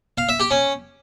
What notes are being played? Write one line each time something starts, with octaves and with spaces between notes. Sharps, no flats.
F5
E5
G4
C#4